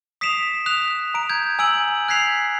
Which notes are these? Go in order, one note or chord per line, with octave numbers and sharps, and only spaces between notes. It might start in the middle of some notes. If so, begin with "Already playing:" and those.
D#6 B6 C7 D7 E7 F7
D#6 F#6 B6 F7
A#5 D7
G6 G#6
G#5 E6 D7 F#7
F#6 G#6 B6 C7 F7